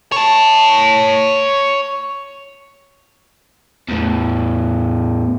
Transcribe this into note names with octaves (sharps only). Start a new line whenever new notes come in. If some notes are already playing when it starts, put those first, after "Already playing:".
C#5 A5
E2 A2